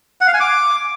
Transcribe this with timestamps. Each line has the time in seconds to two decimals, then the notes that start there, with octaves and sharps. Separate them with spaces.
0.21 F#5
0.27 F5
0.34 G#5
0.40 D6